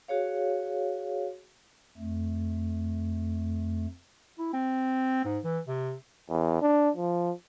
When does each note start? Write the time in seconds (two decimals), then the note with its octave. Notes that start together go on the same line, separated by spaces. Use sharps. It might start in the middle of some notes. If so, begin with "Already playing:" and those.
0.08 F#4 G#4 C#5 F5
1.97 F2 A3
4.38 E4
4.53 C4
5.25 G#2
5.44 E3
5.67 C3
6.29 E2
6.62 D4
6.97 F3